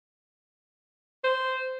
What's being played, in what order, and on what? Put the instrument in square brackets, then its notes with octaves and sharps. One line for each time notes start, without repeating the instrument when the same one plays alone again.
[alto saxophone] C5